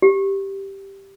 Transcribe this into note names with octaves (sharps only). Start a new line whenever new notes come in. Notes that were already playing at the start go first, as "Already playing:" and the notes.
G4